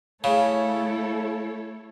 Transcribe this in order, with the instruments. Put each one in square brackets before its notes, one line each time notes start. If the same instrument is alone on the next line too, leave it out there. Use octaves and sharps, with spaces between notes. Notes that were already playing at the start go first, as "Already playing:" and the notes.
[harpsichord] C#3 [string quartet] A3 E4 A4 C#5